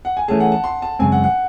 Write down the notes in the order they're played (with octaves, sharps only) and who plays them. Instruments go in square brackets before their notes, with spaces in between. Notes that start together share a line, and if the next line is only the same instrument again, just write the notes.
[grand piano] F#5
G#5
[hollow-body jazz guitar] E3 A3 C#4 G#4 [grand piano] A5
[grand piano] F#5
A5
C6
A5
[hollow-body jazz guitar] F#2 C#3 G#3 C4 [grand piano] G#5
[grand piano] F#5
F#5